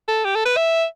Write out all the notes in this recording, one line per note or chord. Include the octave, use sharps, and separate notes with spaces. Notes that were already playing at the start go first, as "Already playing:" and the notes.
A4
G4
A4
B4
E5